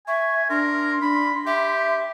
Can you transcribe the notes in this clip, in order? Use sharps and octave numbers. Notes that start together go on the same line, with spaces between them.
E5 G#5 C#6
D4 A#4 C6
D4 B5
G4 E5